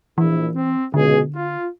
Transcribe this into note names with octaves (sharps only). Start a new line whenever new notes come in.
A#1 E3 E4
C4
C#2 B2 D3 G#4
F4